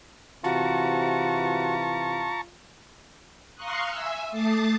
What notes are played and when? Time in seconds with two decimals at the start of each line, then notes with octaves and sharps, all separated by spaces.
0.44 C3 E3 F4 F#4 A5 A#5 C#6
3.55 F5 A#5 C6 C#6 D#6 F#6
3.89 E5 G#5 E6
4.31 A3 A5 D6 D#6 A6 C7